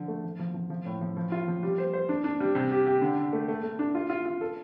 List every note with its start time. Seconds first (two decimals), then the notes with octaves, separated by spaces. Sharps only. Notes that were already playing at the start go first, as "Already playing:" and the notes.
Already playing: D3 F3
0.08 A3
0.24 F3
0.39 F3
0.54 F3
0.70 F3
0.85 A2
1.01 F3
1.17 F3
1.32 F4
1.48 F3
1.63 G3
1.78 C5
1.93 C5
2.09 D4
2.24 D4
2.40 G3
2.55 C3
2.71 G4
2.86 G4
3.02 D3
3.17 D3
3.33 A3
3.48 A3
3.63 A3
3.79 D4
3.95 F4
4.10 F4
4.25 F4
4.41 A4